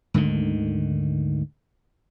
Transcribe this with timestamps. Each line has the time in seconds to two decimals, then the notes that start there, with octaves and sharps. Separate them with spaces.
0.14 D2 G#2 D3 D#3